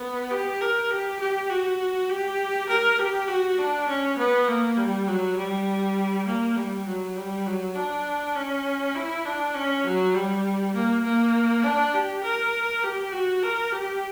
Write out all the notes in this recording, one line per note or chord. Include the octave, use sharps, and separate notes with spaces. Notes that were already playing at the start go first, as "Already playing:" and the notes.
Already playing: B3
G4
A#4
G4
G4
F#4
G4
A#4
G4
F#4
D4
C#4
B3
A#3
G3
F#3
G3
A#3
G3
F#3
G3
F#3
D4
C#4
E4
D4
C#4
F#3
G3
A#3
A#3
D4
G4
A#4
G4
F#4
A#4
G4